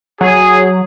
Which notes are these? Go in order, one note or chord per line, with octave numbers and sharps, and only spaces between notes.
F#3 G#4